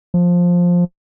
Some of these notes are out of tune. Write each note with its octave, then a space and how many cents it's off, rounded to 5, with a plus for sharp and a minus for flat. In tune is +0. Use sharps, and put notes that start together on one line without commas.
F3 +10